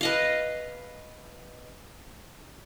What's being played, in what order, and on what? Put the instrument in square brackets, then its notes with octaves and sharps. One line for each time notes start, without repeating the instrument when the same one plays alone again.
[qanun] B4 D#5 F5